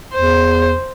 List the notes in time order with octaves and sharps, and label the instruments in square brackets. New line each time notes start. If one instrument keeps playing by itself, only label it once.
[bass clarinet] E2 [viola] C5